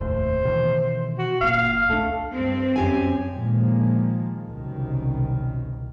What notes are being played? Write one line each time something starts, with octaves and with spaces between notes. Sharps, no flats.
F1 D#2 A2 C5
B2 D#3 E3
F#4
F#1 A#2 F5
C#2 A3 D4
G2 C4
F#2 G4 G#5
A#2 D#3 F3 G#3 A#3
F#1 C2 F#2 B2 D#3